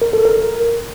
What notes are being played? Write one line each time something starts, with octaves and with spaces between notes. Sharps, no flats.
A#4
A4
A#4